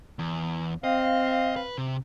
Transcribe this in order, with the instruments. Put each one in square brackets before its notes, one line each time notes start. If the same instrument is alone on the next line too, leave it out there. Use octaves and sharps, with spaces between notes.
[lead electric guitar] E2
[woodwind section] C4 F5 [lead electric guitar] D#5
[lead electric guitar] B4
C3